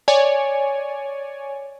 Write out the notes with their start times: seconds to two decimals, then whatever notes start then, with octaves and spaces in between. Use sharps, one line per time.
0.08 C#5 D5 G#5